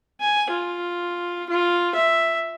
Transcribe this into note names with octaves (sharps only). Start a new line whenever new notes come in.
G#5
F4
F4
E5